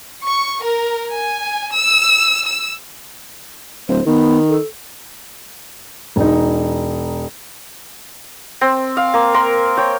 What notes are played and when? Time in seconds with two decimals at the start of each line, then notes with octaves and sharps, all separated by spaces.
0.23 C#6
0.62 A#4
1.13 G#5
1.76 E6
2.47 E6
3.88 D1 C5
4.07 D#3 B3
4.49 A4
6.16 E1 D#4
8.61 C4
8.97 F5
9.14 A#3
9.34 A#4 C6
9.77 C#5 G5